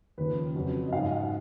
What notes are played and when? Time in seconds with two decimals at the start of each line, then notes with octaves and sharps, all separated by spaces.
0.18 D#2 C#3 F3 B4
0.55 F2 C#3 F#3
0.86 D#5
0.92 G#2 F#3 F5
1.11 F5
1.19 F#5